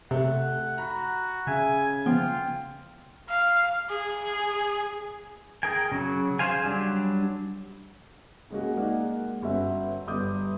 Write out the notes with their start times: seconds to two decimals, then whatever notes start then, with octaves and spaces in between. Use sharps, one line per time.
0.11 C3 A3 F#5
0.78 F#4 A#5 B5
1.47 C#3 E5 G#5
2.06 F3 B3 F4 G5
3.29 F5
3.89 G#4
5.63 G#4 A#4 G5 G#5
5.92 C#3 F#3
6.39 G#4 C5 F5 G#5
6.63 F#3 G3 D4
8.50 C#3 G#3 A#3 F#4
8.77 G#3 A#3 D#4 D5 F#5
9.42 G1 C#4 F#4 E5
10.07 G1 G3 D6 D#6 G6